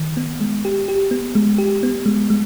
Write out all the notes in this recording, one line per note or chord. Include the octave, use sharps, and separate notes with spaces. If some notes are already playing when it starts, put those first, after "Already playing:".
Already playing: D#3
B3
G#3
G4
G4
B3
G#3
G4
B3
G#3
G#3